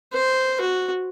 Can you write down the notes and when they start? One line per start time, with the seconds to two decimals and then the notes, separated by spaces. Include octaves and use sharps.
0.13 C5
0.61 F#4